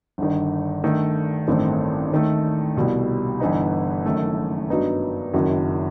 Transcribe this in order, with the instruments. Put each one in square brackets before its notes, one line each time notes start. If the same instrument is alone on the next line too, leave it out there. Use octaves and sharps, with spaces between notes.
[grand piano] G1 G2 D#3
G2 D#3 A3
A1 G2 D#3 A3 C4
D#2 D#3 A3
C2 B2 G3
G1 G2 E3 B3 D#4
F#1 F#2 D#3 A3
G2 F#3 B3 D#4
F#1 F#2 D#3 F#3